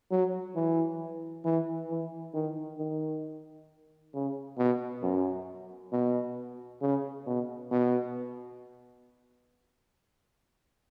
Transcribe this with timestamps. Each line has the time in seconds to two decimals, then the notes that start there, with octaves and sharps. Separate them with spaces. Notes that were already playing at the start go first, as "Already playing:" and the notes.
0.11 F#3
0.56 E3
1.45 E3
1.90 E3
2.34 D#3
2.79 D#3
4.14 C#3
4.58 B2
5.02 F#2
5.92 B2
6.81 C#3
7.27 B2
7.71 B2